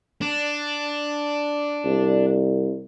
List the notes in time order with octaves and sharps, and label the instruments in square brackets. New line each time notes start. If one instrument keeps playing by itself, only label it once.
[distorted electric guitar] D4
[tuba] C2